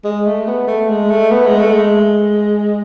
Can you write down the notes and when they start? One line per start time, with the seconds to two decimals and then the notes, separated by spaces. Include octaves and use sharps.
0.05 G#3
0.26 A3
0.47 B3
0.68 A3
0.89 G#3
1.11 A3
1.31 B3
1.46 G#3
1.60 A3
1.74 G#3